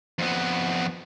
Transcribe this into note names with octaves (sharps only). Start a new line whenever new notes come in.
F2 B3